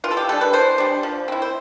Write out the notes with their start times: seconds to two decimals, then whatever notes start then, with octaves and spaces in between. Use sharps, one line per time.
0.04 E3 F4
0.11 A4
0.17 G4
0.29 G3 D4 A4
0.41 B4
0.53 E3 C5
0.78 G3 D4
1.03 F3
1.28 C4 E4
1.42 C5